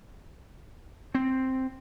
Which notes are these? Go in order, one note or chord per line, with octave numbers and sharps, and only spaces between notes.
C4